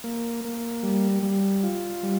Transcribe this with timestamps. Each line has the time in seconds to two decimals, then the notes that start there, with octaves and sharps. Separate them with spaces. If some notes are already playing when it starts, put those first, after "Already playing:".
0.04 A#3
0.45 A#3
0.83 G3
1.23 G3
1.63 F4
2.03 G3